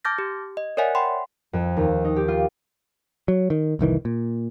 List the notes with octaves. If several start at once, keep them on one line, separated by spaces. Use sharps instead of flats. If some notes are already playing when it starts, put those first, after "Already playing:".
A5 D6 F6 G6 A6 A#6
G4
D#5
A#4 C#5 D5 E5 F#5 G#5
F#5 G5 B5 C6
F2
D#2
D#4
G4
F4
F#3
D#3
F1 C2 D#3 E3
A#2